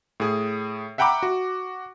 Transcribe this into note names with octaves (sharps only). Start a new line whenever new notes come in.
A2 G#4
E5 F#5 G5 A#5 B5 D6
F#4